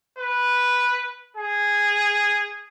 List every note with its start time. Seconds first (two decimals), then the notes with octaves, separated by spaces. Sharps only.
0.19 B4
1.37 G#4